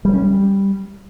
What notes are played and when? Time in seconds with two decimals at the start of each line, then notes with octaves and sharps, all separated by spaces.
0.05 G3
0.14 C#4
0.22 G3